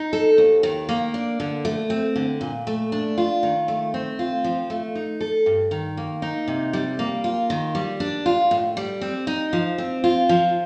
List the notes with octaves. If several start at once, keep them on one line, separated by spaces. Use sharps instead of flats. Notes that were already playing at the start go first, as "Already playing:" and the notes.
Already playing: D#4
A4
D#2
D#3
A#3
D4
D3
A3
C4
D3
A#2
A3
D4
F4
D#3
A3
C4
F4
F3
A3
D#4
A4
G2
D#3
A#3
D#4
C3
G3
A#3
F4
D#3
G3
D4
F4
A2
G3
C4
D#4
F3
C4
F4
F3